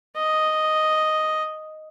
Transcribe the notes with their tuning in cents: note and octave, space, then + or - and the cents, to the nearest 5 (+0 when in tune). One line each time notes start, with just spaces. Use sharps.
D#5 +0